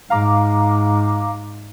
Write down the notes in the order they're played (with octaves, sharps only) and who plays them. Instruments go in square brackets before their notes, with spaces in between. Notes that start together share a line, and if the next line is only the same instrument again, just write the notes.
[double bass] G#2 [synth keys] F5 A#5 D6